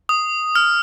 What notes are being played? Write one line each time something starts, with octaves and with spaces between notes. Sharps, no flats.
D#6
F6